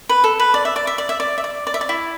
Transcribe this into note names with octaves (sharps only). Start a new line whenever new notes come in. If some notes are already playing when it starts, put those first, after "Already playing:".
B4
A4
B4
D5
E5
D5
E5
D5
E5
D5
E5
D5
D5
E5
D5
E4